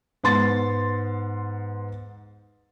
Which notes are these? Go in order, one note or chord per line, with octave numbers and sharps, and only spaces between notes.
G#2 B3 C6 A6